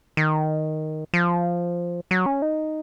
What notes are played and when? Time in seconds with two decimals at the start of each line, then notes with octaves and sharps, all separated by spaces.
0.17 D#3
1.14 F3
2.11 F#3
2.26 C#4
2.42 D#4